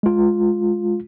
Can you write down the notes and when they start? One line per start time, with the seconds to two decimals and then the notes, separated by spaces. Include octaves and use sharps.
0.03 G#3 F4